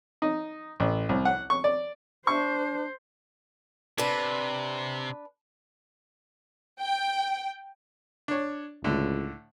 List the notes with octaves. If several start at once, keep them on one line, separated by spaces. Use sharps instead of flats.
D#4
A1
C2
F#5
C#6
D5
D4 C5 C#6
C3 D4 B4
G5
D4 C#5
C#2 A2 D3